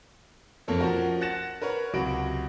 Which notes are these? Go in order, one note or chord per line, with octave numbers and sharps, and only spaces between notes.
F2 A#3 A4 C#5
F3 C#4 F#4 A#4
F#5 F#6 A6 A#6 E7
A#4 B4 C#5 F#5
C#2 C3 F#3 F#4 B5 D7